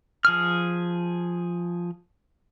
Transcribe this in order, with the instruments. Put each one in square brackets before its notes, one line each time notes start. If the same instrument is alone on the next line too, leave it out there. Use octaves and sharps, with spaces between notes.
[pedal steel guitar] F3 G#4 F6